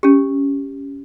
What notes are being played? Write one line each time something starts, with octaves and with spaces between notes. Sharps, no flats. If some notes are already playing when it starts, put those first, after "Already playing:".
C#4 G4